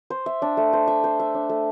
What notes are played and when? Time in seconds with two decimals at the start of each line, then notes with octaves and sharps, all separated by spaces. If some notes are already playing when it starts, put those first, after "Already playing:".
0.10 C5
0.26 E5
0.42 D4
0.57 A3
0.73 C5
0.88 E5
1.04 C5
1.20 E5
1.35 D4
1.49 A3